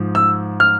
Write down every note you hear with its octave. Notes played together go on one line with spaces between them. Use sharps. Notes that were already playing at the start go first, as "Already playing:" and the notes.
Already playing: G#2 F3
E6
F6